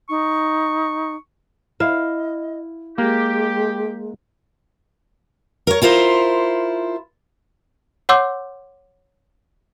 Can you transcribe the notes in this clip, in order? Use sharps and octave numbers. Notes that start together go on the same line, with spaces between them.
D#4 C#6
E4 D#5 F5
G#3 A#3 G4
A#4 C#5
E4 F4 A#4 C5
C#5 F#5 C6 D6 E6 G6